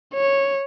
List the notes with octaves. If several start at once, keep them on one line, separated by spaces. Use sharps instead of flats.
C#5